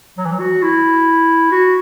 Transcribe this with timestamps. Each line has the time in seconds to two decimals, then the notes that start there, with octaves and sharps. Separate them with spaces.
0.18 F#3
0.25 E3
0.32 F#3
0.40 F#4
0.63 E4
1.51 F#4